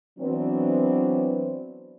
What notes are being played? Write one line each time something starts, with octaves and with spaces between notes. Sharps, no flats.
E3 F#3 B3 C4 D4